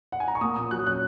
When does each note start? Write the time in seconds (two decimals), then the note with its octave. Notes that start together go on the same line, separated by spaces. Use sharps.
0.12 F#5
0.20 G#5
0.28 A#5
0.35 C#6
0.41 A#3 D#6
0.56 A#2 D#6
0.71 F#3 F#6
0.86 C#4 F#6